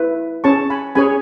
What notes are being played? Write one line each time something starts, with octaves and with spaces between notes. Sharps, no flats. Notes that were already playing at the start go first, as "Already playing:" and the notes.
Already playing: E4 B4
C#4 G#4 C#5 A5 C#6
G#5 B5
C#4 G#4 C#5 G#5 B5